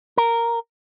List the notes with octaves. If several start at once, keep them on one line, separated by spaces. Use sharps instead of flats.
A#4